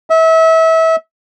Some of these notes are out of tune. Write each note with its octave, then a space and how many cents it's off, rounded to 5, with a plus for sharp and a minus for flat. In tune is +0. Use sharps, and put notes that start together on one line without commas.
E5 -30